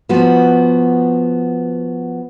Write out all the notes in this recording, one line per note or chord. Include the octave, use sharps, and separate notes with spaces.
F3 B3 F#4